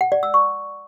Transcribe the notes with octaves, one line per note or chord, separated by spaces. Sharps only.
F#5
D5
E6
C#6